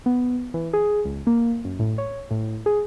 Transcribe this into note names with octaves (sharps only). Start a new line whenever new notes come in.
B3
E3
G#4
C#2
A#3
F#2
A2
C#5
A2
G#4